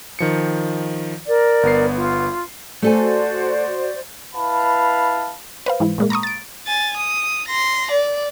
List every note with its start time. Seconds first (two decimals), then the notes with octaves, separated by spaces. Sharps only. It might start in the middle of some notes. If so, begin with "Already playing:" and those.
0.19 D#3 F3 C#7
1.26 A#4 D5
1.63 G1 B3 C7
1.95 F4
2.82 A3 F#4 A4 C5 D5 G#5
4.35 E4 B4 F5 A5 B5
5.66 B4 C5 F5
5.80 G#2 E3 E4
5.98 A#2 G#3 A#3
6.10 A#5 B5 C#6 D#6
6.23 A6 D7
6.67 G#5 A6
6.97 D#6
7.47 C6 A#6
7.91 D5